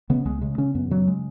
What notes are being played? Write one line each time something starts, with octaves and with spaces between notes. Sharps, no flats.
C#3 B3
C#2 G#3
C#3 G#3
C#3 C#4
F#2 B3
C#3 F#3
G#3